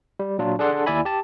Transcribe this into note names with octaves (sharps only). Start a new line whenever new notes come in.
G3
A#2 F#3 D4 F4
D4 G#4 A4 D5 F#5 C6
D#2 E4 D5 E5 G#5 B5
G4 A5